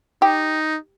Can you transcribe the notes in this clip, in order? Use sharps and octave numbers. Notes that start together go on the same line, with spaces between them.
D#4 G4